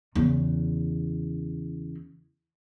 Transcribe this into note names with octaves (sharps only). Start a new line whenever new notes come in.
E2 C#3